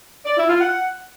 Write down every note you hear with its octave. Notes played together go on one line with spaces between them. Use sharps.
D5
E4
F4
F#5